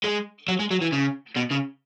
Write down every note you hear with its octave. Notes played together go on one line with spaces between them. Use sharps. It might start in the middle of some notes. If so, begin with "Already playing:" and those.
G#3
F#3
G#3
F#3
E3
C#3
B2
C#3